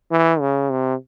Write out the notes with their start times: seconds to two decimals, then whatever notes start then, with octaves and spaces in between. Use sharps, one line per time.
0.11 E3
0.40 C#3
0.71 C3